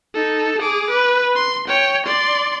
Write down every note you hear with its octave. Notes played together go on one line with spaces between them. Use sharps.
D#4 A4
G#4 D6
B4
C6
C#5 G5
D5 C6